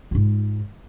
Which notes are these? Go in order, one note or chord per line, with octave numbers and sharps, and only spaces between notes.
G#2 F4